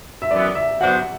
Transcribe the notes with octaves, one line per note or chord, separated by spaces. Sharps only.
E5
F#2 E3 B3 D5
E5
F#3 B3 D4 F#4 C5 F#5